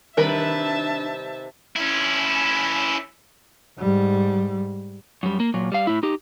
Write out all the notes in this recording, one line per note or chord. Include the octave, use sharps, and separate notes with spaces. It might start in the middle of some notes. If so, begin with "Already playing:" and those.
C3 D#3 G3 D4 A#4 B4 E5 A5
C#4 E4
G#2 G3
F#2 G3
A#3
A#2 F#3
G3 F5
A2 E4
D#4 G4